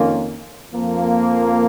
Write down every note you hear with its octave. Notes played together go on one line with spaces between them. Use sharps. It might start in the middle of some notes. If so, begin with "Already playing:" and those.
Already playing: F2 D#3 A#3 C#4 F4
F2 F3 A#3